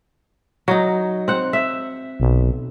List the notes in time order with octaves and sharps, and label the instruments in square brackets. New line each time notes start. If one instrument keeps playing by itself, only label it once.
[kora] F#3 D#4
C4 F#5
E5
[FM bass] B1